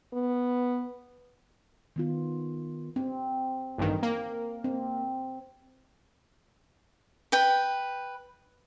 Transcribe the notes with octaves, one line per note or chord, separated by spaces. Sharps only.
B3
D#3 B3 F4
C4
A1 G2 D#3
A#3
C4
B4 G5